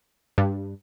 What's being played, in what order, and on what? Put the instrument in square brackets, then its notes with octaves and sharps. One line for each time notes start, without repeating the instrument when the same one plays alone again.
[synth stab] G2